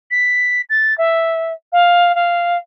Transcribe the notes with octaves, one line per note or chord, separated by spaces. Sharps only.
B6
A6
E5
F5
F5